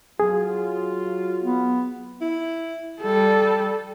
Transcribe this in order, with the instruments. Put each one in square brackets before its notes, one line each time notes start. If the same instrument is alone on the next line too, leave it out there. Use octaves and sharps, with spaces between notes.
[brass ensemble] F#3 F4 [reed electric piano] G#4
[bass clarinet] B3
[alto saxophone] E4
[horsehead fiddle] G3 A4